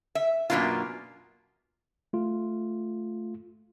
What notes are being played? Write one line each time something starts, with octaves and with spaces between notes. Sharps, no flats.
E5
F#2 B2 D#3 A#3 D4 F4
A3 F4